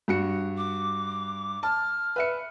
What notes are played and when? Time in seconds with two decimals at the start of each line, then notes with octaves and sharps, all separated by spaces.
0.08 G2 F#4 C#7
0.57 D6
1.63 A5 F6
2.16 B4 E5 C#7